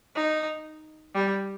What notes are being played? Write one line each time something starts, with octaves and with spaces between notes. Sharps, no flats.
D#4
G3